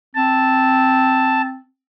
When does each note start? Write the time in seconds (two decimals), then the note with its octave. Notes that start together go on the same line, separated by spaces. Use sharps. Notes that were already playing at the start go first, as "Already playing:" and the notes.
0.15 C4 A5